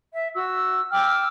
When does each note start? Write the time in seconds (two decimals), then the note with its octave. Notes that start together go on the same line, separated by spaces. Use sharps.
0.13 E5
0.35 F#4 E6
0.92 G5 D6 E6 F6